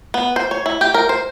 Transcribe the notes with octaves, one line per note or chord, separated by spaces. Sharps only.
B3
C5
C#5
E4
G4
A#4
C5